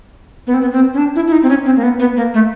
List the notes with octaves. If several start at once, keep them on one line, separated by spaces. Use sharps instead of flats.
B3
C4
B3
C4
C#4
D4
E4
E4
D#4
C4
C#4
C4
A#3
B3
B3
A#3
A3